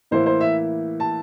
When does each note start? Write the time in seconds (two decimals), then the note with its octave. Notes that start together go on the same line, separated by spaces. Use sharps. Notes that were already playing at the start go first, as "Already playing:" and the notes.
0.11 A2 E3 A#3 E4 C5
0.26 C5
0.41 E5
1.00 A5